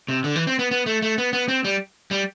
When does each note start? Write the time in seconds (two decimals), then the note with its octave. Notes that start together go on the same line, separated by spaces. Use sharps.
0.09 C3
0.24 D3
0.36 E3
0.47 C4
0.59 B3
0.71 B3
0.86 A3
1.02 A3
1.18 B3
1.33 B3
1.49 C4
1.64 G3
2.11 G3